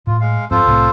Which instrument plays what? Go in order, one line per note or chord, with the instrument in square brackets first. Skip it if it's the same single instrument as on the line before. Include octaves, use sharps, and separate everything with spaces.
[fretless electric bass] A2 [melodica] F4
[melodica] G#3 F5
[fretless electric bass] F2 G#2 C4 [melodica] F4 A4 C5
[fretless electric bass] C2 A2 C4